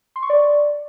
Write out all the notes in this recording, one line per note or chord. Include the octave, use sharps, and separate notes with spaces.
C6
C#6
D5